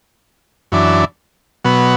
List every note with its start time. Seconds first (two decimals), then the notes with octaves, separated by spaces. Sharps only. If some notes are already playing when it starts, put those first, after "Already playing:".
0.72 F#2 E3 D4
1.64 B2 F#3 B3